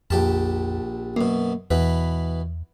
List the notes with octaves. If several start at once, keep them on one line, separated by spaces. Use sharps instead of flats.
A#1 F2 G4 A5
F#2 B2 A#3
E2 B2 E3 B4